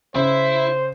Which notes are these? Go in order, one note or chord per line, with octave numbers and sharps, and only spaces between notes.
C#3 E4 C5